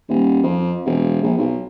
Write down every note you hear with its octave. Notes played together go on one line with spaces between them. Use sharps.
D#1
F2
E1
A#1
B1